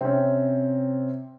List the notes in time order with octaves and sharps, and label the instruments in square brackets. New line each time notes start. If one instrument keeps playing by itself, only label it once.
[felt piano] C3 [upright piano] C4 C#4